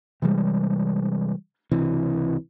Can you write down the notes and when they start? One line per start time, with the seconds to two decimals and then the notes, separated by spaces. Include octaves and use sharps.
0.22 C3 E3 G3 G#3
1.71 C#2 C3 E3